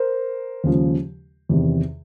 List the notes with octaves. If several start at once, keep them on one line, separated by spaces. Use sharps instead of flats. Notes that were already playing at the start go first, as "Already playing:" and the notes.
Already playing: A#4 C5
D#2 C#3 F3 G#3
E2 C3 D#3